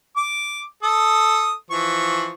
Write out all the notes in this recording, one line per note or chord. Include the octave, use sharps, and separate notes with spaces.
D6
A4 D#6
E3 F3 C#6